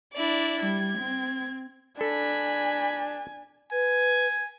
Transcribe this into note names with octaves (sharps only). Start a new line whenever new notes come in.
D4 E4 D5
G3 G#6
C4
D4 A4 G#5 B5
B4 G#5